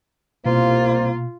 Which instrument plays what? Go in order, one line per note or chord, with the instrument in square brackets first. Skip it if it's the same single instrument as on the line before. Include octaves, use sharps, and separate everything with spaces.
[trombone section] C2 C5 [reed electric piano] B2 [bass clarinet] A#3 [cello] F4